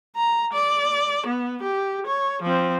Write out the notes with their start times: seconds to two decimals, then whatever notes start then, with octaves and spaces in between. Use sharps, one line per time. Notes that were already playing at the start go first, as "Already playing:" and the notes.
0.16 A#5
0.53 D5
1.26 B3
1.62 G4
2.07 C#5
2.42 F3 C4